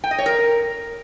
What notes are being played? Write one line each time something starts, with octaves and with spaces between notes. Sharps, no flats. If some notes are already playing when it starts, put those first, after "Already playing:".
G5
D#5
C#5
A#4